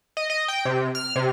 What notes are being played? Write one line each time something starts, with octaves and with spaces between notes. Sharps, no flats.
D#5
D#5
G5
C3
F6
C3